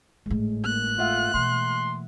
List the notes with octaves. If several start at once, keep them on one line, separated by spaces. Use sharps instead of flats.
G#1 A2 G#3
A#3 F#6
A3 F4 E5 F#5
B2 E3 C6